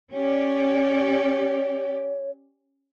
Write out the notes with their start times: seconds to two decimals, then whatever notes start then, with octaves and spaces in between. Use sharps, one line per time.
0.13 C#4 G4 C#5 D5